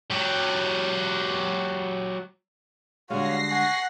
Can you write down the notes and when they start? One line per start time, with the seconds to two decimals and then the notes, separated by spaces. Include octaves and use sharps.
0.10 F#3 G4
3.10 D3 G3 G#3 F#4 C#5 F5 A#6 C7
3.51 F#5 G#5 C#6